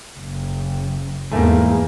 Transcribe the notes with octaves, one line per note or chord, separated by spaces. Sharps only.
F#1
E2 G#2 A3 A#3 G#5